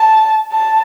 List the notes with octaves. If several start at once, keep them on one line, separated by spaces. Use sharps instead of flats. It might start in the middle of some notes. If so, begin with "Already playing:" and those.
Already playing: A5
A5